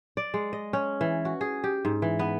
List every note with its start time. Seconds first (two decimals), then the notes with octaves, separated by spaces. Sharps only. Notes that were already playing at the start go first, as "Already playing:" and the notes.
0.17 D5
0.34 G#3
0.53 D#5
0.73 C#4
1.01 E3
1.25 F#4
1.41 G#4
1.64 G4
1.85 G#2
2.02 E3
2.19 B3